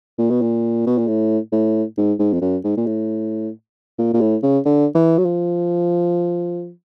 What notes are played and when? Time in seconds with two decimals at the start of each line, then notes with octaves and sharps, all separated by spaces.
0.18 A#2
0.30 B2
0.42 A#2
0.87 B2
0.98 A#2
1.08 A2
1.52 A2
1.97 G#2
2.19 G#2
2.33 F2
2.42 F#2
2.64 G#2
2.77 A#2
2.87 A2
3.98 A#2
4.13 A#2
4.21 A2
4.43 C#3
4.65 D3
4.95 E3
5.18 F#3
5.25 F3